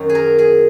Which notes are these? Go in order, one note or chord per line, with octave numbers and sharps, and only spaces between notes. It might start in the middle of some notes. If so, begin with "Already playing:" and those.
Already playing: F#2 D#3 F#3 F#4
G#4
A#4
G#4